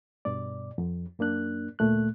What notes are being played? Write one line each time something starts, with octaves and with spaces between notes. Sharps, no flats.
G2 B2 D5
F2
F#2 A#3 D4 F#6
D2 A#2 A3 F#6